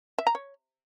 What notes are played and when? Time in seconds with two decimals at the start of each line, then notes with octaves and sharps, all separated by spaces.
0.18 E5
0.27 A#5
0.35 C#5